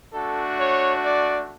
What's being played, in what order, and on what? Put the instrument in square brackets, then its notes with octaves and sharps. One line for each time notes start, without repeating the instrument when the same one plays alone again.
[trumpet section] A3 D4 F#4 A4
C#5
D5